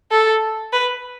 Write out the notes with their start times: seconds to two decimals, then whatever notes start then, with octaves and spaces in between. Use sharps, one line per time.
0.11 A4
0.73 B4